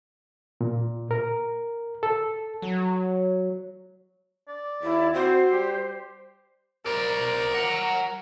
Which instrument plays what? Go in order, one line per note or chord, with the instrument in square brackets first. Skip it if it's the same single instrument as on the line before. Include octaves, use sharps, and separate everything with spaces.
[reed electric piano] A#2
A#4
A4
[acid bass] F#3
[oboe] D5
[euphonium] D#2 [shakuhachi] E4
[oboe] C4 [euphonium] F#4 [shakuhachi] C5
[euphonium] G3 [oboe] G4
[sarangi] A#4 [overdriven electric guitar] C5 D5
[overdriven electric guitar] F#5 A#5